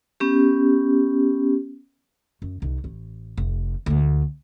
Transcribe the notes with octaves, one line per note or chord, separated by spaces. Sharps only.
B3 C#4 G4
F#2
C2 D#4
A1
F1
D2 G#3